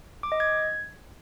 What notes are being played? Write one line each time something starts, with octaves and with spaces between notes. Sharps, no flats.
D6
D#5
G#6